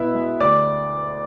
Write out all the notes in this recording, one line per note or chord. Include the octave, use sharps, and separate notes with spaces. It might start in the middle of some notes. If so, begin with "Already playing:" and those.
Already playing: B2 B3 E4 E5
G#3
D2 D5 D6